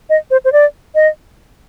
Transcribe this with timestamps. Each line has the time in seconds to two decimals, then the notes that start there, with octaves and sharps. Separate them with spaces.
0.10 D#5
0.31 C5
0.45 C5
0.52 D5
0.95 D#5